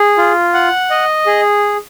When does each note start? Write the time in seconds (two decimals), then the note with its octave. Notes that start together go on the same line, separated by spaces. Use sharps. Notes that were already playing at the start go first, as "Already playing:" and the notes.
Already playing: G#4
0.18 F4
0.54 F#5
0.90 D#5
1.26 G#4